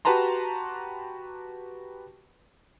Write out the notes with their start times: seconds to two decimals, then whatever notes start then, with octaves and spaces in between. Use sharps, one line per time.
0.05 F#4 G4 B4 A5 A#5 C6